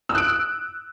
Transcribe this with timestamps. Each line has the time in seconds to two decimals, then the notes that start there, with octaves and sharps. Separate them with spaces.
0.09 E6
0.12 D#6
0.15 F#6
0.18 D7